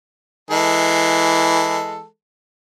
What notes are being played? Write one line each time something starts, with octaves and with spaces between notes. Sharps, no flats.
E3 G#3 A4